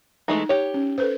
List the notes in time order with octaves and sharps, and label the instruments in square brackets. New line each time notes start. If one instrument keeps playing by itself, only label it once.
[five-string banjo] E3 G#3 A3 [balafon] D#4
[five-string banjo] G4 C#5
[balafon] C#4
A4 B4 C5